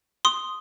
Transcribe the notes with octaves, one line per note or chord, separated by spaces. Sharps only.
C6 D#6